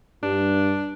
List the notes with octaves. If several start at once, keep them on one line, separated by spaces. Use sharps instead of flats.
G2 D4